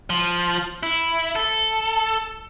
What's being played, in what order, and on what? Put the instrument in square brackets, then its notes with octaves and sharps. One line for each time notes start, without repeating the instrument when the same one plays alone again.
[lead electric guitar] F3
E4
A4